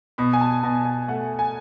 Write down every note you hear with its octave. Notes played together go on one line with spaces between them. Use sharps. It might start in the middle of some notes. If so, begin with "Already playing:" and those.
B2 B5
G#5
A5
B2 A5
G#5
A3 F#5
G#5